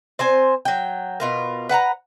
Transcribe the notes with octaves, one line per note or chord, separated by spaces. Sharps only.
C4 C5 G#5
F#3 G5
B2 F4 A#4
B4 F#5 A5 A#5